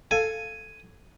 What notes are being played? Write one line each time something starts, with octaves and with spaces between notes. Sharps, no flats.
A4 F5 G#5